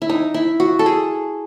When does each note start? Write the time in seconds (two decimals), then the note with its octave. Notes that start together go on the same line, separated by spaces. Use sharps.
0.02 E4
0.09 D#4
0.34 E4
0.60 F#4
0.79 A4
0.86 G#4